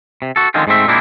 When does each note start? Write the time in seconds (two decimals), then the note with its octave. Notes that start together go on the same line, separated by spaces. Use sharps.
0.22 C3
0.36 F#4 A4
0.54 D3 D#3 F3 G#3 C4 F4
0.67 G#2 G#3 A3 C4 E5
0.88 A#2 G#3 A#3 C4 D4 E4